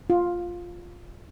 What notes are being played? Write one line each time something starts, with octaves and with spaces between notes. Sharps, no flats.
F4